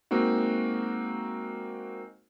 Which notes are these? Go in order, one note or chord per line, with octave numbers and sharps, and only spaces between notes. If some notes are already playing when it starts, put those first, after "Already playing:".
G#3 A#3 C4 D#4 F#4